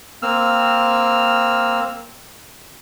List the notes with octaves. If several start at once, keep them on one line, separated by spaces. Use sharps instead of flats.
A#3 C4 E6 F6